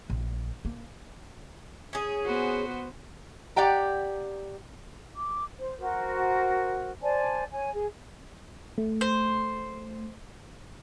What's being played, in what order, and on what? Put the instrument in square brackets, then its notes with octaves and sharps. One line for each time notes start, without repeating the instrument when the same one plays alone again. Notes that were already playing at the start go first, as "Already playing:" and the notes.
[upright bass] A#1
A#3
[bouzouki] C#4 G#4
[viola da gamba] B3 F#4 C5
[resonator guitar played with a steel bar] G4 D5 F#5 G5 A#5
[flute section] D6
C5
F#4 A#4 C5
C5 D5 G#5 A5
C#5 G#5
G#4
[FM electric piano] A3
[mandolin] C5